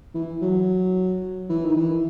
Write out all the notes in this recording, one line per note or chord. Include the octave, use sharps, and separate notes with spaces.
E3
F#3
E3
D#3
E3